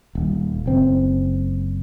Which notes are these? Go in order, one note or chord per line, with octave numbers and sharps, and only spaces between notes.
D#1
F#1 C4